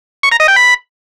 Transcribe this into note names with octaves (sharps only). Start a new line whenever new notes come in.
C#6
A#5
D#5
G5
B5